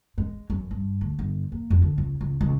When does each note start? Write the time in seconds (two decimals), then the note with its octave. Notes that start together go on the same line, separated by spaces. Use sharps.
0.18 G#3
0.50 F#2
0.71 G2
1.01 D2
1.19 G1
1.52 A#3
1.70 F2
1.82 D3
1.98 C#2
2.21 C#2
2.41 C#2